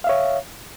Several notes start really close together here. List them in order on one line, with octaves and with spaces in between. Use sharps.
F5 E5 C#5